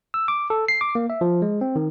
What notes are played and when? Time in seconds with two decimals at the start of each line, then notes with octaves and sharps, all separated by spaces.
0.14 E6
0.28 D6
0.50 A4
0.68 C7
0.81 D6
0.95 A#3
1.10 E5
1.21 F3
1.42 G#3
1.61 C4
1.76 D#3